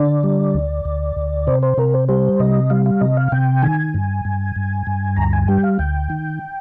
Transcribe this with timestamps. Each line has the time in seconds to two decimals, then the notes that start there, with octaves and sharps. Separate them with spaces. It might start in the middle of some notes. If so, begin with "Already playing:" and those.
Already playing: D3 D5
0.23 G3
0.54 D2
0.85 D2
1.16 D2
1.47 C3 C5
1.63 C5
1.78 C3 A#4
1.94 C5
2.09 G3 C5
2.40 C3 D#5
2.70 G3 F5
2.86 F5
3.01 C3 D#5
3.17 F5
3.32 C3 G5
3.62 D#3 G#5
3.94 G2
4.25 G2
4.56 G2
4.87 G2
5.16 D2 A#5
5.33 G#5
5.48 G3 G5
5.63 F5
5.79 D2 G5
6.10 D#3